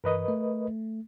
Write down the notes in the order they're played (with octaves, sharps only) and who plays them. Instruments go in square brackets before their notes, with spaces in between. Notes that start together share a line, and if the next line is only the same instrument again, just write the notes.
[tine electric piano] G2 E3 [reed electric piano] A#4 B4 D#5
[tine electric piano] A3